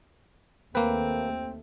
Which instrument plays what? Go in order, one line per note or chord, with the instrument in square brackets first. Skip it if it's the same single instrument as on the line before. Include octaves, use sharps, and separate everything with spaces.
[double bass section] D#2 A3 [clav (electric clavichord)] A#3 B4 [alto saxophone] C4